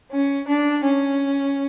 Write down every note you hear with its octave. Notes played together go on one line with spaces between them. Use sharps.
C#4
D4
C#4